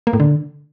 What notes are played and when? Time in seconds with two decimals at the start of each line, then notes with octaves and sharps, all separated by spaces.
0.07 A#3
0.13 A2
0.20 D3